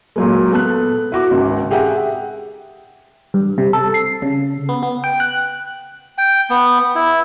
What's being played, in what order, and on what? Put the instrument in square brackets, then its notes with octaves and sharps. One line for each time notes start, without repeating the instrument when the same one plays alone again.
[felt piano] A#2 F#3 G#3
B3 A4 A5 F#6
E4 F#4 D6
G#1 C#2
G4 G#4 E5 F#5 G5
[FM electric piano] G2
C3
A4
C7
C#3
B3
B3
G5
F#6
[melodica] G5
B3
E4